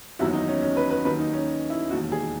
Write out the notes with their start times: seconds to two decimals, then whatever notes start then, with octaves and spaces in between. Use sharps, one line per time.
0.19 F#1 E2 D#3 F#3 E4
0.33 D#4
0.48 C#4
0.62 C#4
0.77 B4
0.90 B4
1.05 D#2 D#3 F#3 B4
1.19 D#4
1.33 C#4
1.70 E4
1.90 E1 D#2 D#3 F#4
2.12 G#4